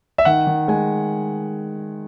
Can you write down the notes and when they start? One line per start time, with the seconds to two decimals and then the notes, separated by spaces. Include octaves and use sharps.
0.18 E5
0.25 D#3 F#5
0.47 D#3
0.68 G#3 G#5